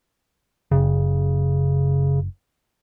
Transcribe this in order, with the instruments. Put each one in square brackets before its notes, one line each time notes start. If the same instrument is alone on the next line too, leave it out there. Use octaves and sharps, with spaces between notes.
[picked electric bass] F#1 [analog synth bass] C#3